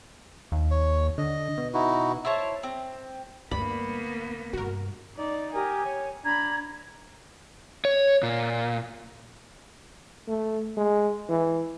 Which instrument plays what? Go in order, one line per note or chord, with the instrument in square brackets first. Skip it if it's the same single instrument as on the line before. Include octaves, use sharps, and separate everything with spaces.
[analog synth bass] D#2
[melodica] C#5
[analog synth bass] D3 [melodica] D#5
[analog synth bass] B2
[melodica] D#4 E4 F#4
[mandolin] E4 C5 C#5 A5
C4
[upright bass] D2 [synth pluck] G2 D5 [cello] A#3 B3 [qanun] B5
[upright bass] G2 C3 [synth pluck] F#4 A#4
[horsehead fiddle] D#4 D5
[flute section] G4 A#4 D#6 [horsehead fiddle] G#5
[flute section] C#5
[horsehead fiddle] D4 B5 [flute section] A#5 G#6
[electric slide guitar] C#5
A#2
[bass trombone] A3
G#3
E3